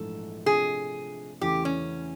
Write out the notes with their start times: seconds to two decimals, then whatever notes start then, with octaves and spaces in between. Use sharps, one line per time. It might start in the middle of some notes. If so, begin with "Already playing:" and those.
Already playing: A#1 G#2 E3 A3 A4
0.46 C3 F3 A3 D4 G#4
1.41 E2 C#3 E3 A3 G4
1.65 C#4